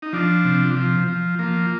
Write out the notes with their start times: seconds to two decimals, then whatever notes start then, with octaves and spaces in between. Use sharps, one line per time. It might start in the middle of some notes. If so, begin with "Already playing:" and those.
0.02 D#4
0.13 F3 D4
0.45 C3
0.76 F3
1.08 F3
1.39 F3 A#3